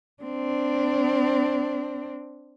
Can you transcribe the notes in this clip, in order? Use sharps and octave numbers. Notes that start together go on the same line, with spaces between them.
C4 D4